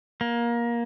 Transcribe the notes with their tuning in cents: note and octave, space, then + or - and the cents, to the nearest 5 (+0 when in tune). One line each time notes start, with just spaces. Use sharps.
A#3 +20